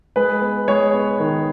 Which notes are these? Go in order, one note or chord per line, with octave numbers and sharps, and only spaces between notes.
G#3 B4
B3
G#3 C#5
B3
D#3